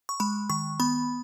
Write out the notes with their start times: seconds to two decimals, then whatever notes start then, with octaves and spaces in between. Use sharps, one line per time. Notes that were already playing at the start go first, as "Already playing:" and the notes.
0.09 C#6
0.20 G#3 B5
0.50 D#3 C#6
0.80 B3 B5